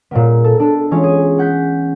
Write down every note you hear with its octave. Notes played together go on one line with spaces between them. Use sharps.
A#2 G#3 A#3 B3
A4
D4 A4
E3 G#3 C#4 F4
G#4
F#5 F#6 G6 B6